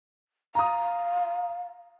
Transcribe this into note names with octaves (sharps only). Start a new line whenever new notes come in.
F5 A#5 D#6